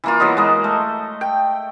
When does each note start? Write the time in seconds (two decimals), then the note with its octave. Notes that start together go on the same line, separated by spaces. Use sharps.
0.04 E3 A#3 F4
0.20 E3 F#3 B3 D#5
0.37 G#3 A#3
0.64 A3
1.21 G5